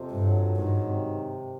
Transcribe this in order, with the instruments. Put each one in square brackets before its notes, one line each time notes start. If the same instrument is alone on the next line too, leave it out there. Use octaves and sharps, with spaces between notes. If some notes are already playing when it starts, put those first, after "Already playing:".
Already playing: [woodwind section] F2 C3
[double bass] G2
[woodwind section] F#3
[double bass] G#2 [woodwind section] D#3
[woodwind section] C3